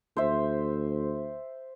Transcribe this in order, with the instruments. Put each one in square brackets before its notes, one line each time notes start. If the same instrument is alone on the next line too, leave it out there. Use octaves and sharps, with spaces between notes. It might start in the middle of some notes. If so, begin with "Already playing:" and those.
[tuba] D2 [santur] C5 E5